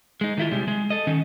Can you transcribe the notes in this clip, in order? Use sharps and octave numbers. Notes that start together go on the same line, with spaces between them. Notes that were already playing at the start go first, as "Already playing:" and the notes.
G#3 D#4
D#3 E4 F4
C3 G3 G#3
G#3
A4 D#5
D#3 C#4 D#4